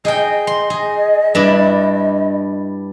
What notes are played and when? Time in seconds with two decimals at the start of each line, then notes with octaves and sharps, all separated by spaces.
0.05 G#4 D#5 G5
0.47 C6
0.70 G#4
1.35 G2 D4 E4